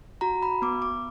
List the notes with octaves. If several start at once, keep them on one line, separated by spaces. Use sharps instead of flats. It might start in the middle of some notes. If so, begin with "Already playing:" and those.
F#4 A#5
B5
B3 D6
D6